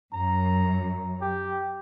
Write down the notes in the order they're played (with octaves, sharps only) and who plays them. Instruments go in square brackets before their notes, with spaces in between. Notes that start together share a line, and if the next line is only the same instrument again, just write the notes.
[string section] F#2 [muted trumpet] A#5
[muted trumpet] G4